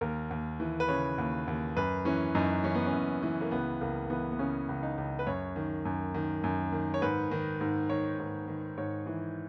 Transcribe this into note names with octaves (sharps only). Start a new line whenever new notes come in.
D#2 A#4
D#2
E3
B4
C#3 C#5
D#2
D#2
F#2 B4
E3 C#4
F#2 D#4
E3 C#4
B3
C#4
F#2
E3
A#3
C#2 B3
C#2 A#3
E3 B3
B3
C#3 C#4
C#2
D#4
C#2
B4
F#2 C#5
D#3
F#2
D#3
F#2
D#3
C#5
G#2 B4
D#3
G#2
D#3 C#5
G#2
D#3
G#2 C#5
E3